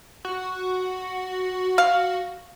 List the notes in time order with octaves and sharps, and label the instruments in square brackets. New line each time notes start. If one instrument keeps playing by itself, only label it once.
[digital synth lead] F#4
[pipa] F5